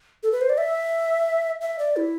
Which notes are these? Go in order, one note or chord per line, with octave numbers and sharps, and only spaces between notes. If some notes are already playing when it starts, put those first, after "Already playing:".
A4
B4
C5
D5
E5
E5
D5
E4